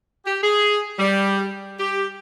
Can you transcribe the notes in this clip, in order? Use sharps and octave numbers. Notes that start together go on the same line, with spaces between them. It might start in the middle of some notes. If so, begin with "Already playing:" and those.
G4
G#4
G3
G4